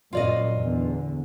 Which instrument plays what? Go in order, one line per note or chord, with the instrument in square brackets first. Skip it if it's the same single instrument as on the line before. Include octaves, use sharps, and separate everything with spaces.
[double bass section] F#2 A#2 [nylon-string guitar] F4 D5 D#5
[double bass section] E2 D3